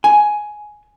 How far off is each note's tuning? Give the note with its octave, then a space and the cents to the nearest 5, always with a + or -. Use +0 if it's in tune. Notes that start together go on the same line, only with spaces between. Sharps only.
G#5 +10